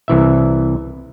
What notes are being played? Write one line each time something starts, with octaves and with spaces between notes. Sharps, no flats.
C2 E3 E5